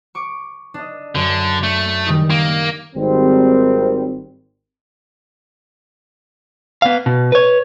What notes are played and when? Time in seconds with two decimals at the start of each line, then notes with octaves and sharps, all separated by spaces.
0.15 C#6 D6
0.74 D4 D#5
1.15 F#2 D3
1.63 A3
2.06 D#3 G3 D#4
2.30 A#3
2.96 G#1 D#3 G3 C4
6.82 B3 F5
7.06 B2
7.32 B4 C#5